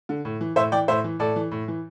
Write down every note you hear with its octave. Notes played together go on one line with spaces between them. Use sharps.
D3
A2
E3
A2 C5 E5
E3 D5 G5
A2 C5 E5
E3
A2 A4 D5
E3
A2
E3